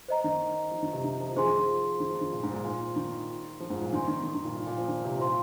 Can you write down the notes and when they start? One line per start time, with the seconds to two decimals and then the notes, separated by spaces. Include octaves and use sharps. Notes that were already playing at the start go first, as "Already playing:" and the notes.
0.08 C5 D#5 A#5
0.24 D#3
0.71 F3
0.82 D#3
0.93 C3
1.04 D#3
1.20 F3
1.37 D#3 G#4 C5 G#5 C6
1.47 D#3
1.57 F3
2.00 D#3
2.10 F3
2.21 D#3
2.33 A#2
2.43 G#2
2.54 A#2
2.64 A#2 C5 G#5 C6
2.96 D#3
3.60 F3
3.70 G#2
3.81 A#2
3.93 D#3 C5 G#5 C6
4.08 D#3
4.23 D#3
4.34 D#3
4.45 A#2
4.56 A#2
4.67 A#2
4.78 F3
4.88 D#3
5.04 C3
5.19 A#2 F4 C5 F5 C6